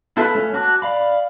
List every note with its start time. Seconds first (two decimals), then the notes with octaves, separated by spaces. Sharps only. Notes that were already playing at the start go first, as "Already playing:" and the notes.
0.17 E4 F4 A4 B4 E5
0.35 A3 C#4
0.54 F#4 A5 D6 F#6
0.82 D5 F5 B5